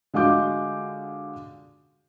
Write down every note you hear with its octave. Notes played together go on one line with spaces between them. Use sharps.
D3 G#3 F4 F#4 D6 G6